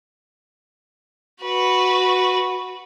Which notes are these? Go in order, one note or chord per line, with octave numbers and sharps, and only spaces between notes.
F#4 B4